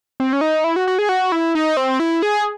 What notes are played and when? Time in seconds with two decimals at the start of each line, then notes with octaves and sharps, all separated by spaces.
0.20 C4
0.33 C#4
0.41 D#4
0.64 E4
0.76 F#4
0.87 F#4
0.99 G#4
1.09 F#4
1.32 E4
1.55 D#4
1.77 C4
2.00 E4
2.23 G#4